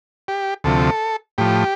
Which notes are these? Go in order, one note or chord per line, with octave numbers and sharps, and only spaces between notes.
G4
D2 C3 F3 A4
A2 F3 G4